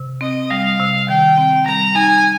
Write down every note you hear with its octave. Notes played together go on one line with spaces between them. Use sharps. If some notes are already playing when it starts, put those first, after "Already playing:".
Already playing: C3
C4 D#5
G3 F5
C3
D#3 G5
C4
G3 A#5
D#4 G#5